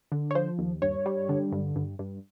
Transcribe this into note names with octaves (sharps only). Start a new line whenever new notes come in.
D3
C#5
F3 C5
D#2
G2 C#5
G3
D3
G2
G2
G2